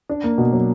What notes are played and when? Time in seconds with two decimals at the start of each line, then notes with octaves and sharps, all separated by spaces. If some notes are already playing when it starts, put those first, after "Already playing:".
0.09 D4
0.24 A#3
0.38 B2
0.53 F#3